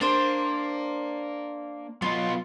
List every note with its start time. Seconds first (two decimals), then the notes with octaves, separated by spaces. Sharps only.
0.01 A#3 D4 C5
2.02 F#3 B3 F4 D#5